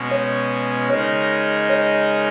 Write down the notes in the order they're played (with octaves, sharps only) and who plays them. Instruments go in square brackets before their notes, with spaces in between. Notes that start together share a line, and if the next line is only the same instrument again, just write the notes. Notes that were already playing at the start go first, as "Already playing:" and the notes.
Already playing: [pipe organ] B2 G#3 C#4
[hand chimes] C#5
[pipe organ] C#3 G#3 D#4 A#4 [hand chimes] C#5
[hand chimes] C#5